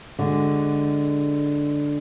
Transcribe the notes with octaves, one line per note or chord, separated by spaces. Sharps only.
D3 G#3 F#4